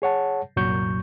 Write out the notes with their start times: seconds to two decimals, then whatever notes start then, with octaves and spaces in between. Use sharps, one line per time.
0.02 G#4 C#5 F#5 A5
0.56 C2 F#2 A#2 F#3 C#6 G6